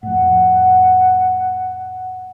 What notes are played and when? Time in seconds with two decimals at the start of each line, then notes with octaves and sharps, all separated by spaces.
0.03 F2 A2 F#5